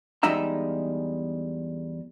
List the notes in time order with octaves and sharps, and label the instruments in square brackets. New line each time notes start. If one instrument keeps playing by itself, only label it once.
[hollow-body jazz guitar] E2 G3 G#3 D#4 E5 A#5